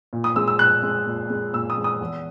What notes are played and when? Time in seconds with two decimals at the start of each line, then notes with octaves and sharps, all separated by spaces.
0.13 A#2
0.24 D#6
0.36 G#3 E6
0.48 E6
0.59 A#2 F#6
0.83 G#3
1.06 A#2
1.30 G#3
1.53 A#2 E6
1.70 D#6
1.77 G#3
1.84 D#6
2.01 E2